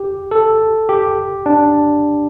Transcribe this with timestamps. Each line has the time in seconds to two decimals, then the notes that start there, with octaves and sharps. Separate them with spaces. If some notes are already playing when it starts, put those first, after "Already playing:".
Already playing: G4
0.31 A4
0.89 G4
1.46 D4